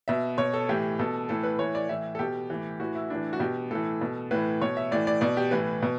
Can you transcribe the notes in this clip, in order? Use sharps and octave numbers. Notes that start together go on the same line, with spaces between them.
B2 E5
B2 C#5
A4
A2 E3 G4
B2 A4
A2 E3 A4
B4
A2 E3 C#5
D5
A2 E3 E5
A4
B2 G4
A2 E3
A2 E3 F#4
E4
A2 E3 D4
F#4
B2 G4
A2 E3 A4
B2
A2 E3 B4
B2 C#5
E5
A2 E3 D5
D5
B2 D5
G4
A2 E3 B4
B2